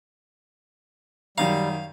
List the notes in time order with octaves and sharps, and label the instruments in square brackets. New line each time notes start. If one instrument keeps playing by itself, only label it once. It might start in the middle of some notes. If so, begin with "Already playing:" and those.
[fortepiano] F#2 D#3 A#5 [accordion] G3 [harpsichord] F5